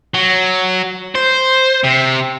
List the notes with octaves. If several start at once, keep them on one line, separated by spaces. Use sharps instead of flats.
F#3
C5
C3